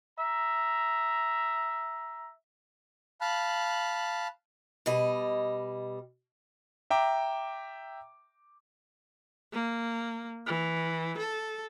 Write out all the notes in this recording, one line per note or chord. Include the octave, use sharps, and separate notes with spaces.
E5 A#5
F5 A5 B5 F#6
B2 G3 D#5
E5 G5 A#5 D6
A#3
E3
A4